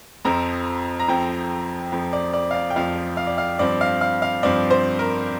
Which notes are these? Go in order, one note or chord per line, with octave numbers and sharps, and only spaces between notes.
F2 F3 C4 A#5
A#5
F2 F3 C4 G5
F2 F3 C4
D5
D5
F5
D5
G5
F2 F3 C4 F5
F5
D5
F5
G2 F3 C4 D5
F5
F5
F5
G2 F3 C4 D5
C5
A#4